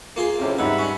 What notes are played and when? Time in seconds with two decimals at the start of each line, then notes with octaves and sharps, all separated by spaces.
0.16 A#3 F4 G#4
0.39 F2 A2 C3 C4 C#4
0.58 G#2 G3 D#4 B4 E5 F#5 B5
0.79 C#4